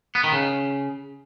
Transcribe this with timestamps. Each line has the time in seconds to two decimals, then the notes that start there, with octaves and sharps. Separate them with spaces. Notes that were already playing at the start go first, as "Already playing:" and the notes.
0.15 B3
0.24 D#3
0.32 C#3